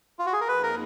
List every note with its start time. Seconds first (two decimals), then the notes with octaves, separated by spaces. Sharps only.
0.19 F4
0.26 F#4
0.33 G#4
0.41 A#4
0.48 F2 F3 A#3 D#4 G#4 B4
0.63 A#4